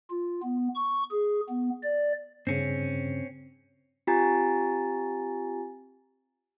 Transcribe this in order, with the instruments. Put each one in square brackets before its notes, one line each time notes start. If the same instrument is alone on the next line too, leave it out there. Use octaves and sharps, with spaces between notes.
[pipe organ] F4
B3
C#6
G#4
B3
D5
[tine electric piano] G2 C#3 [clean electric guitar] C4 C#4
[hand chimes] C4 F4 G4 G#5 A#5 A6